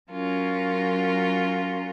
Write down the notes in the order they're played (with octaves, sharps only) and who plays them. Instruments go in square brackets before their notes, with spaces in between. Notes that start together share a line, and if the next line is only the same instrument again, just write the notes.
[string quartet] F#3 C#4 F4 A#4